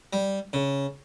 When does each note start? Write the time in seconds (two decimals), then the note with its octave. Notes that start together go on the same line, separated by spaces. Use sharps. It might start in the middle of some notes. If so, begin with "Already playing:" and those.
0.13 G3
0.53 C#3